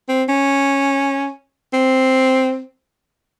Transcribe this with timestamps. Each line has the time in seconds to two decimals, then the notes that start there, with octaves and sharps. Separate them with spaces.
0.08 C4
0.29 C#4
1.73 C4